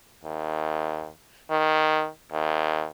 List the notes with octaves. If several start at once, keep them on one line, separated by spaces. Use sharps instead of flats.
D#2
D#3
D#2